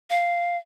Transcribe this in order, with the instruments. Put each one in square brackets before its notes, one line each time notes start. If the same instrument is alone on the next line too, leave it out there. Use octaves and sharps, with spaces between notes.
[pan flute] F5